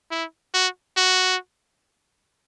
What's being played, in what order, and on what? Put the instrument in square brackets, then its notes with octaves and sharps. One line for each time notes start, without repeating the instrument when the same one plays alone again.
[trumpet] E4
F#4
F#4